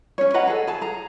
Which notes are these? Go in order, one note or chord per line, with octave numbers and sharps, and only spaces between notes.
C#4 C#5
B4 D#5 F#5 A#5
G#4 A4
G#4 A5
G#4 A#5